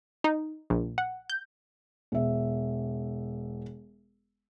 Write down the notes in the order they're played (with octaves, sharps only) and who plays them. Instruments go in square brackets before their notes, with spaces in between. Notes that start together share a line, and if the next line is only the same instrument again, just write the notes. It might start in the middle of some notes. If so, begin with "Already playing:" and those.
[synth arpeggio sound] D#4
A#1
F#5
G6
[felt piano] E1 E5